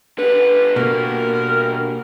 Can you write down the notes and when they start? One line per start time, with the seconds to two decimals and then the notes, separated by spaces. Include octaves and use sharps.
0.19 D3 G3 B4
0.76 B2 A#3 A#4